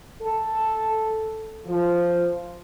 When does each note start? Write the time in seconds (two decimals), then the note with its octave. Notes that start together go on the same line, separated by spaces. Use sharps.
0.21 A4
1.67 F3